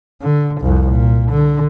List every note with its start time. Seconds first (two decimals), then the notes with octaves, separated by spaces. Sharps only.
0.22 D3
0.61 C2 F2
0.89 A#2
1.31 D3